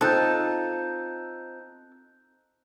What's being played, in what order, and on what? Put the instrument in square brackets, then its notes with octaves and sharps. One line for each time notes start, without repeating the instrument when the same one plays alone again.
[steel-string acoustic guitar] C4 D#4 F4 [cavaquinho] A4 D#5 [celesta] F#6 G6